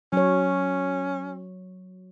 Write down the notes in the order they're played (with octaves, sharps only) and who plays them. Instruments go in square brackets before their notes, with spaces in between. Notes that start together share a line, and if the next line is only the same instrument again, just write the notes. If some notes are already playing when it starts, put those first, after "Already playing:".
[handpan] F#3 C#5 [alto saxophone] C#4